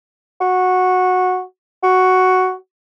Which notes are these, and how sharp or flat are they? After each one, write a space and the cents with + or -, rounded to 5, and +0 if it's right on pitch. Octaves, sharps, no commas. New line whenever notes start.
F#4 -10
F#4 +5